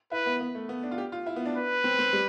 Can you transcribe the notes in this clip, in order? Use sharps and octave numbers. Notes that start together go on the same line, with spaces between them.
E4 B4
B3
B3
A3
B3
D4
F4
G4
F4
E4
B3
D4
B4
C4
C4
G3